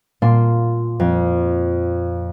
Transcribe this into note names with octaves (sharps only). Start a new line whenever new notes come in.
A#2 A#3 D4 C6
F2